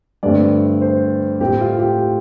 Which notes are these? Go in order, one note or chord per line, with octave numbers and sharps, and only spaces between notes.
G2 D3 A3 C4 D5
C5
A2 A3 C4 G4
F4
G4